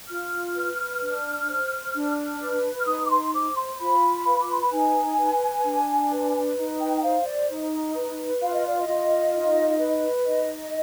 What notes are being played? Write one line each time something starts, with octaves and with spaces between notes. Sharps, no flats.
F4 F6
B4
D4
C5
D4
B4
F6
D#4 D#6
D6
C6
C5 D6
C6
F4 B5
B4
D6
C6
B5
D#4 G#5
B4
D4
B4
D#4
G5
G5
C5 F5
D5
D#4
B4
F4 F5
D#5
D5
D#5
F4
D#4
B4
D#4 D#5